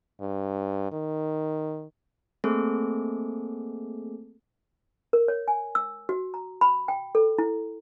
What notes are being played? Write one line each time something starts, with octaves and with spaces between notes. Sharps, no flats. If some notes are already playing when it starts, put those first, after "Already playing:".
G2
D#3
A3 A#3 C4 G#4 A4
A#4
C#5
G#5
E6
F#4
A#5
B5
G5
A4
E4